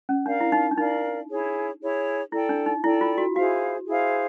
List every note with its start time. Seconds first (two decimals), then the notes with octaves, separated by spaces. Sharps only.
0.09 C#4
0.26 D4 A#4 D5 F5
0.40 E4
0.52 D#4
0.71 D4
0.78 D#4 A#4 D5 F5
1.29 E4 G#4 C#5
1.81 E4 G#4 C#5
2.32 E4 A4 D5 G5
2.49 D4
2.66 D#4
2.84 E4 A4 D5 G5
3.01 F4
3.18 F#4
3.35 E4 F#4 G#4 C5 F5
3.87 E4 G#4 C5 F5